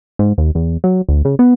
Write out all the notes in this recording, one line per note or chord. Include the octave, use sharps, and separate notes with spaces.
G#2
D#2
E2
F#3
D2
C#3
B3